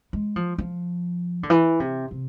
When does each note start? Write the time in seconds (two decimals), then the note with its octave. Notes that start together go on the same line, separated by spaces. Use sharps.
0.13 G#3
0.36 F3
0.58 F3
1.43 D3
1.50 E3
1.80 C3
2.11 C3